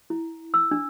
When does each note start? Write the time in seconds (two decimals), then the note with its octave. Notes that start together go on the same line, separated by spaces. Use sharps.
0.10 E4
0.54 E6
0.71 D4